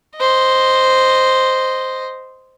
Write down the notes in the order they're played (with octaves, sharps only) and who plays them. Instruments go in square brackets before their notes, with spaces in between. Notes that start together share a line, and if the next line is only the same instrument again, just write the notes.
[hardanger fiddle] C5 D#5